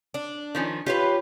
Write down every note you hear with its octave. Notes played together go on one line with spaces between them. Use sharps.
D4
D#3 F3 C#4
F4 G4 B4 C#5